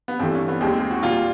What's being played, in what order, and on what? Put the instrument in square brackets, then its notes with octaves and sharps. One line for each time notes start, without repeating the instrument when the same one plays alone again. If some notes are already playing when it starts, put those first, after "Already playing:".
[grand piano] B3
G2 E3 A3 C4
C#4
B3
D#2 D#3 G#3 C4
F#4
A#2 G3 A#3 F4